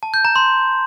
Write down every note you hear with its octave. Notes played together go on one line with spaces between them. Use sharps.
A5
G6
A#5
C6